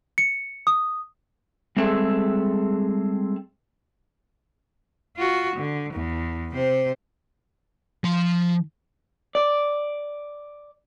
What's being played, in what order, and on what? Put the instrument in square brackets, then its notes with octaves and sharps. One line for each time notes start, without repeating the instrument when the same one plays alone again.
[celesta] C#7
D#6
[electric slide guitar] G3 G#3 C4 G#4 A4 E5
[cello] F4 F#4
D3
E2
C3 C5
[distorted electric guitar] F3 C6
[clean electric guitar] D5